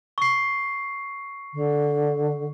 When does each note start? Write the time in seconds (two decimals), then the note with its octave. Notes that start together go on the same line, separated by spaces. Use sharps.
0.18 C#6 C7
1.54 D3